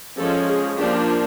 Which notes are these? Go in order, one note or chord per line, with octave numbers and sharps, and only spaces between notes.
F3 G#3 C#4 A4
G#4
F3 A#3 D4 G4